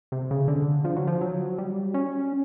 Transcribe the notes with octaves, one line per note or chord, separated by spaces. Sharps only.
C3
C#3
D3
F3
F#3
F3
F#3
G3
C#4